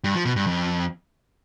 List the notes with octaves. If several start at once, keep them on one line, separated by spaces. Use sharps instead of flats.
G2
F3
B2
G2
F2